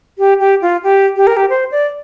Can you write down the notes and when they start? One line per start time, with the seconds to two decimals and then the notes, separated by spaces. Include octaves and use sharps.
0.18 G4
0.40 G4
0.62 F4
0.83 G4
1.16 G4
1.27 A#4
1.37 G4
1.49 C5
1.71 D5